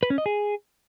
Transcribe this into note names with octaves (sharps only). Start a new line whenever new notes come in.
B4
C#4
D#5
G#4